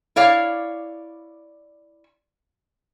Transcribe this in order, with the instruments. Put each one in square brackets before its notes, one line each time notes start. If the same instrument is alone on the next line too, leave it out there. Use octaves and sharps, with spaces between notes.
[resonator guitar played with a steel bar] E4 C#5 D5 F5